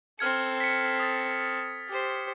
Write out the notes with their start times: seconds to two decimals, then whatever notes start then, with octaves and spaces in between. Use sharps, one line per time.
0.19 C4 A4 F6 G#6 C#7
0.60 B6 C#7
1.00 D#6 A6
1.88 G4 C5